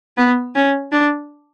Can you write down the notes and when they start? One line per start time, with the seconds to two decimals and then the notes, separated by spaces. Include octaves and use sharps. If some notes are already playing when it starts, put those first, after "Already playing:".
0.17 B3
0.55 C#4
0.92 D4